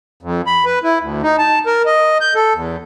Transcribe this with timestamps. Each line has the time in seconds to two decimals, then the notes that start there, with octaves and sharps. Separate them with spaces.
0.23 F2
0.47 B5
0.65 B4
0.84 E4
1.01 D2
1.23 D#4
1.38 A5
1.66 A#4
1.86 D#5
2.21 G6
2.35 A4
2.54 E2